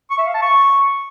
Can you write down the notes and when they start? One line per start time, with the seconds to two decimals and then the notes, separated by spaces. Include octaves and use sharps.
0.11 C#6
0.19 E5
0.27 F5
0.35 A5
0.42 C#6